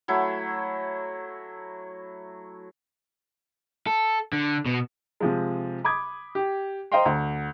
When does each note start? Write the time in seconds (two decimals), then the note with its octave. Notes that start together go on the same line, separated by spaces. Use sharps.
0.08 F#3 A3 E4
3.87 A4
4.33 D3
4.66 B2
5.20 C3 F3 G#3
5.84 B5 D6 D#6 G#6
6.35 G4
6.92 C5 D#5 F5 G5 A#5 C6
7.06 D2